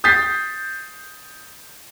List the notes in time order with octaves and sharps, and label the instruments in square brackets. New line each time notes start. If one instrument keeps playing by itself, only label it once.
[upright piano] D#6 G6 A6 B6 C7